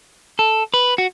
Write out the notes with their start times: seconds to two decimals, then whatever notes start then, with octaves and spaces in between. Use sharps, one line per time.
0.39 A4
0.74 B4
0.98 F#4